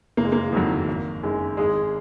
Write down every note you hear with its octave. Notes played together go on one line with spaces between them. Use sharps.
F#1 A#3
G#3
A#3
F2 D#3 F#3
G#1
F#2 D#3 G#3
G#1 G#3 G#4